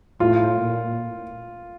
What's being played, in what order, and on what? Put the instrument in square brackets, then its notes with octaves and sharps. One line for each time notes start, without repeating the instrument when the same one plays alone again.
[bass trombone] A2 [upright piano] F4
[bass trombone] A#2